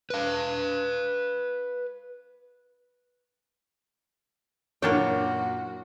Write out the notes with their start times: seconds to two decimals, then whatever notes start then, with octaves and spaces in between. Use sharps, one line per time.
0.10 B4 F5
4.82 F#2 A#2 E3 A#3 D4 F#4 C#5 G5